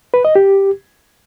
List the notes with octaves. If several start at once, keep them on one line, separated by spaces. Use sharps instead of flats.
B4
D#5
G4